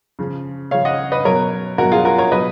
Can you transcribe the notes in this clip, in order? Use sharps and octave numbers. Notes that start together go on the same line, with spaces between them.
C#3 F3
C#3 F3 C#5 F5
D#5 F#5
B4 D#5
B2 F#3 A#4 C#5
B2 F#3 F#4 A#4
F4 G#4
F#4 A#4
A#4 C#5
B2 F#3 B4 D#5